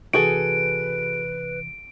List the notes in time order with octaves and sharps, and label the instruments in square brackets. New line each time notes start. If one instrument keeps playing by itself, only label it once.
[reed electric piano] C3 E3 [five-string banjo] F#4 G#4 A4 [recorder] B4 [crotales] D7